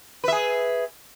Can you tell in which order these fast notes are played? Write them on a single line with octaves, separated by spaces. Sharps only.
B4 E5 G#4